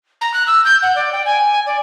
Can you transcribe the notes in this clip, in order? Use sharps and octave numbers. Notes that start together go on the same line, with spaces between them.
A#5
F#6
E6
G6
F#5
D5
G5
G#5
D5